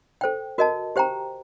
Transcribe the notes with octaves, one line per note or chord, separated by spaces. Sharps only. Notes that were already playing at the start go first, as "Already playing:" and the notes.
A4 C5 G5
F#4 A#4 D#5 A5
G4 C5 G5 A#5